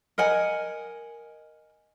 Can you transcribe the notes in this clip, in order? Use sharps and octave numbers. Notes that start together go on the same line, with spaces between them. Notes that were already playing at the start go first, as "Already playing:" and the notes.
A#4 D#5 F#5 G#5